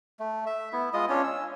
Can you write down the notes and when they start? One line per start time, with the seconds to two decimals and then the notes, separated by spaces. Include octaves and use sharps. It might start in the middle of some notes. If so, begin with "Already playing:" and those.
0.19 A3
0.47 E5
0.73 B3 E4
0.94 G#3 F4 D#5 D#6
1.09 C#4 D4 F4 C#5
1.23 E6